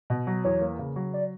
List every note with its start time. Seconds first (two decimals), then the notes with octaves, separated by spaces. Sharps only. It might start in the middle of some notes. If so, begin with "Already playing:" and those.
0.10 B2
0.27 F#3
0.44 E2 C#5
0.61 A#3
0.79 C#3
0.96 F#3
1.14 D5